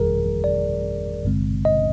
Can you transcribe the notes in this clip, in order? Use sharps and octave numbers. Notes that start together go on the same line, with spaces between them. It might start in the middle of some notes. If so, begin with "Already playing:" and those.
Already playing: G1 F2 D#3 G3 G#4 A#4
D5
G#1 G2 D3 G#3 C4
D#5